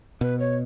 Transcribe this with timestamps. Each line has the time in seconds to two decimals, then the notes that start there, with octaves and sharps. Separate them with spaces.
0.21 B2 B4
0.40 C#5